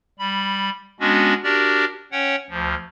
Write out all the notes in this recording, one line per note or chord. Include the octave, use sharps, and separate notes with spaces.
G3 B5
G#3 B3 C#4 D4 F#4
D4 F#4 G4 A#4 D5
C#4 C#5 F#5 G5
D2 F3